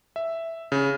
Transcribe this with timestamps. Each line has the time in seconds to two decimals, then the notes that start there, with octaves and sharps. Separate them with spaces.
0.16 E5
0.72 C#3